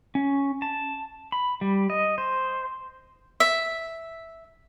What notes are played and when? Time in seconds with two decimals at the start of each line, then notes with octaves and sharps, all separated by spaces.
0.15 C#4
0.62 A5
1.32 B5
1.61 G3
1.90 D#5
2.18 C5
3.40 E5